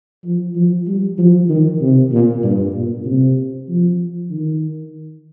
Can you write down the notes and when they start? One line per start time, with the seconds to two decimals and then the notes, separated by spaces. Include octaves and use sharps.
0.24 F3
0.56 F3
0.87 G3
1.18 F3
1.49 D#3
1.81 C3
2.12 A#2
2.43 G2
2.74 A#2
3.06 C3
3.68 F3
4.30 D#3